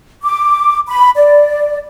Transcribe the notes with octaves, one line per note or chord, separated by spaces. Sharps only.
D6
B5
D5